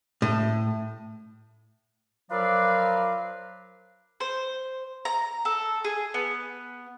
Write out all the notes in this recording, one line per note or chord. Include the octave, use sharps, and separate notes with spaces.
A2
F3 F#3 A#4 B4 D5 F5
C5
A#5
A4
G#4
B3